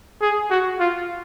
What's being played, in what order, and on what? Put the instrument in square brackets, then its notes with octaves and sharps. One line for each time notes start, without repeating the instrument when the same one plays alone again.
[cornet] G#4
F#4
F4